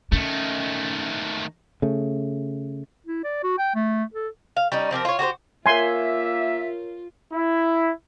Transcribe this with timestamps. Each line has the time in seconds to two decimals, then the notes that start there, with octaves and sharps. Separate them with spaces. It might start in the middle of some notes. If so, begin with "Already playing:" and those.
0.12 D#3 A3 C#4
1.82 C#3 A3
3.06 E4
3.24 D5
3.43 F#4
3.58 G5
3.75 A3
4.14 A4
4.56 F5
4.72 G3 C#4 D#4
4.91 F3 C4 G4 A#4
5.05 F4 C#5
5.19 F#4 G4 B4 C5
5.66 A#3 F4 A#4 C#5 E5 G#5 C6
7.33 E4